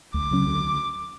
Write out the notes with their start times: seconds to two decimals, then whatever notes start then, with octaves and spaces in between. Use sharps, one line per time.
0.14 D2 D6
0.31 C#3 F#3 C#4
0.47 D2